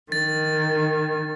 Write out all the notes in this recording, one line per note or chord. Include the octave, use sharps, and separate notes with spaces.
D#3 A6